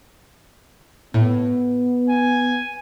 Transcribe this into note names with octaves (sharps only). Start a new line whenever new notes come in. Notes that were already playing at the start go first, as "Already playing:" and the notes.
A2 B3
G#5